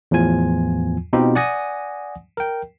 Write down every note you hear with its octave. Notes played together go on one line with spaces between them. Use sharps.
E2 A2 F3 F4 G#5 G#6
B2 C4 D#4 F4 G4
D5 F#5 G#5 D#6 A#6
A#4 G5